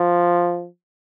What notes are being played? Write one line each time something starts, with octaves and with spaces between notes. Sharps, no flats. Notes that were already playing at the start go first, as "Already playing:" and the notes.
Already playing: F3